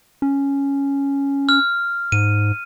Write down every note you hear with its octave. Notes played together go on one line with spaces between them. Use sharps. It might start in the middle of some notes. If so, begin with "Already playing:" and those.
C#4
F6
G#2 D#7